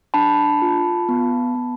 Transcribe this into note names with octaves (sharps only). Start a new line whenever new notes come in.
D4 A5 B5
F4
B3
B3